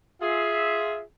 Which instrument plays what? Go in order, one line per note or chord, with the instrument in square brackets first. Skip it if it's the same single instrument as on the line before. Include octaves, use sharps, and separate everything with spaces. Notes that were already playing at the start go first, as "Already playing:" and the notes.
[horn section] F4 G#4 E5